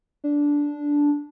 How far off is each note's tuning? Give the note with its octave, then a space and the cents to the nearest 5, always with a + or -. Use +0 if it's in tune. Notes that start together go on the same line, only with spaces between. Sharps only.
D4 -10